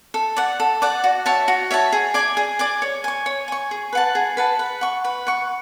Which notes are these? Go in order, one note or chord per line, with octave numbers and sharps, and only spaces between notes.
A4
D5 F#5
A4
D5 F#5
F#4
C#5 E5 A5
F#4
C#5 E5 A5
G#4
D5 G#5 D6
G#4
D5 G#5 D6
C#5
G#5 C#6
C#5
G#5 C#6
G#4
B4 F#5 A5
G#4
B4 F#5 A5
B4
F#5 C#6
B4
F#5 C#6